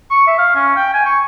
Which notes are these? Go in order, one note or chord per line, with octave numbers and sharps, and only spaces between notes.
C#6
E5
F5
C#4
G5
G#5
C#6